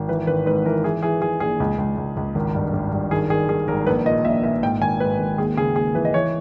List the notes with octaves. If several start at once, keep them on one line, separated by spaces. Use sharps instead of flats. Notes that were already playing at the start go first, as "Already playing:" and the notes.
Already playing: G#1
E3 B4
G#1 B4
G#2 B4
E3 A#4
E3 G#4
E3 G#4
E3 G#4
A#1 G#4
C#2
C#2
C#2
C#2
G#1
G2
G#1
G2
D#3 G#4
D#3 G#4
D#3 G#4
G#1 A#4
A#1 B4
A#2 D#5
A#1 E5
A#2 E5
G#2 G5
G#1 G#5
G#2 B4
G#1
D#2 G#4
C#3 G#4
D#2 G#4
E3 B4
D#5
E3 C#5